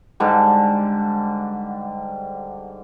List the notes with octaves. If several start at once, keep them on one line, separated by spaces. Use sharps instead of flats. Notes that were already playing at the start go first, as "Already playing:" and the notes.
G#2 D3 G3